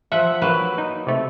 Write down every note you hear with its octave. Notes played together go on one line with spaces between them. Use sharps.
F3 E5 F#5
F#3 A#3 B4
D#4
C3 A3